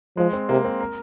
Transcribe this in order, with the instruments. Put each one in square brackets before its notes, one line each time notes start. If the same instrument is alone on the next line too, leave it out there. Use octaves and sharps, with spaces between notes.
[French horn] F3 [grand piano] G#3
[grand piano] C4
[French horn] C3 [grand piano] A#3
[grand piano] C4
A#4